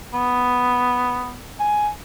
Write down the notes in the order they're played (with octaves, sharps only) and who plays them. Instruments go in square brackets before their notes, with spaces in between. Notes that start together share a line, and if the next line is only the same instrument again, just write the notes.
[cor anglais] B3
G#5